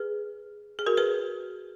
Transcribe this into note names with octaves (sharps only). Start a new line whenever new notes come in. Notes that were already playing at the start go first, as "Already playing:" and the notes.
Already playing: G#4 B4
G#4
F#4 A#4
G#4 B4